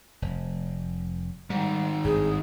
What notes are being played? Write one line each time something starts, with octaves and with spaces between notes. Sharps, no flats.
F1
G#2 D#3 G3
G#1 G2 G#4